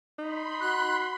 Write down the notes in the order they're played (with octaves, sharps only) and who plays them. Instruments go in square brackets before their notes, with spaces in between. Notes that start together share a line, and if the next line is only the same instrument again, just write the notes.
[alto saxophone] D#4 [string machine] B5 C6
[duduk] F#4 [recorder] F#6